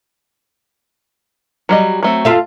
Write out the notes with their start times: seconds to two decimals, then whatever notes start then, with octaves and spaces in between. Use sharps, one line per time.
1.69 F#3 G3 D#5
2.03 F#3 A3 C4
2.25 F4 A4 E5